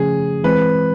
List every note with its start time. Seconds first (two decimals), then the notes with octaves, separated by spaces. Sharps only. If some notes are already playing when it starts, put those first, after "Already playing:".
Already playing: C#3 F3 A3 C#4 G#4
0.44 E3 G#3 C4 B4